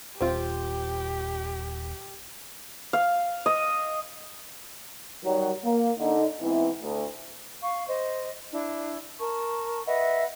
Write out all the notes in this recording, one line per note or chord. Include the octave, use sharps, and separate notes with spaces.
D#1 C4 F4 G4
F5
D#5
D#3 F#3 G3
A#3
D3 D#4
G#2 E3 B3 C4 E4
D2
F5 C#6
C5 D#5
D4 E4
A#4 A5 C#6
B4 D#5 E5 F#5